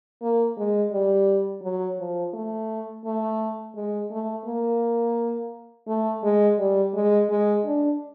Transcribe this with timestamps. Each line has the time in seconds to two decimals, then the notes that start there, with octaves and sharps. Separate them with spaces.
0.22 A#3
0.57 G#3
0.93 G3
1.63 F#3
1.98 F3
2.34 A3
3.05 A3
3.75 G#3
4.11 A3
4.46 A#3
5.88 A3
6.23 G#3
6.59 G3
6.94 G#3
7.30 G#3
7.65 D4